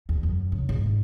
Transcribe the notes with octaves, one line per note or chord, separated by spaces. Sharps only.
E2
F#2
C#3
G#2